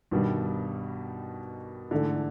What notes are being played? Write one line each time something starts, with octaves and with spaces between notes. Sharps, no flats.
G2 B2 D#3 G3
G#2 D3 E3 A3